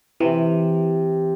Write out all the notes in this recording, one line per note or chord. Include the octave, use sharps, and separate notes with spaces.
C3 E3